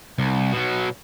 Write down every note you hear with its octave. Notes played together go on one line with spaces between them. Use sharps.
C2
B2 F#3